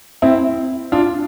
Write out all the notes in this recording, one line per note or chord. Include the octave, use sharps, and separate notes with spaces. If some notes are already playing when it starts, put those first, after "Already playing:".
C4 E4
D4 F4